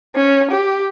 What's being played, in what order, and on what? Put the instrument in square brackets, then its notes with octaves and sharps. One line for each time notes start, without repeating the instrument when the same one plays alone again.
[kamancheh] C#4
G4